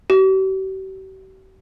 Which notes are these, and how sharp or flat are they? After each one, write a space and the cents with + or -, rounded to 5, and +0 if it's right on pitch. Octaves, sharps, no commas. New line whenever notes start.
G4 -45